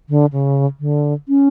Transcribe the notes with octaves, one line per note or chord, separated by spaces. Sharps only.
D3
C#3
D3
C#4